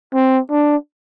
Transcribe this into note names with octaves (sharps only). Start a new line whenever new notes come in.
C4
D4